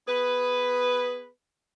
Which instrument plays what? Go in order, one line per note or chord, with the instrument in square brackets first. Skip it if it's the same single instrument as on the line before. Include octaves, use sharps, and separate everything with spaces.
[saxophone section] B3 G#4 B4